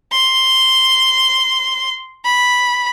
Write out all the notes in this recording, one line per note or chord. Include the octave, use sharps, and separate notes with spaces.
C6
B5